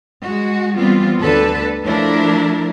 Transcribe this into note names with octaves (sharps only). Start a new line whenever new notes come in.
G#3 F#4
E3 G3 B3 C4 F4
D2 D3 A4 B4
F3 A3 D4 E4 A#4